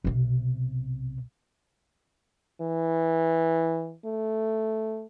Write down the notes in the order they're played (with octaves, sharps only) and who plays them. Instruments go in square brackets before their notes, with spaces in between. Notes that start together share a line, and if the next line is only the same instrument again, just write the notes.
[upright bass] B1 C3
[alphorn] E3
A3